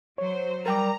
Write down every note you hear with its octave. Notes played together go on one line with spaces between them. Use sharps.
F#3 C5 C#5
G3 A#4 G5 A#5 D6